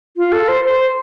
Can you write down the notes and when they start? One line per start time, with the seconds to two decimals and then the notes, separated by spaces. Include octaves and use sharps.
0.17 F4
0.32 A4
0.48 C5
0.64 C5